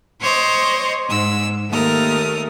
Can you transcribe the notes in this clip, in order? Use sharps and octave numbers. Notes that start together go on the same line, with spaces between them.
C5 C#5 D#5 C6 D6
G#2 E6
D#2 A3 A#4 D#6